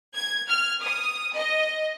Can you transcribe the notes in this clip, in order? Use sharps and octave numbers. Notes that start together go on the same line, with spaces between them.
G#6
F6
D#6
D#5